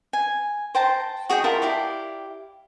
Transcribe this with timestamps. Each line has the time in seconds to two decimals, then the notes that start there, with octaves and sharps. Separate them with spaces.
0.13 G#5
0.75 C5 G5 A5 A#5
1.29 F#4 G#4 D#5 G5
1.44 E4 F4 A#4 A5
1.62 E4 G4 D5 F5